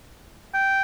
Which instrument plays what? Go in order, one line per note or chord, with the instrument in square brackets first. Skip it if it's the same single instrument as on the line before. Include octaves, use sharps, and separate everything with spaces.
[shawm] G5